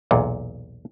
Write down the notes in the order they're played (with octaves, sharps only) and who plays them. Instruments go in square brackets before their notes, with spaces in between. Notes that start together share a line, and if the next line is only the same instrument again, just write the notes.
[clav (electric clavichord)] B1 E2 A#2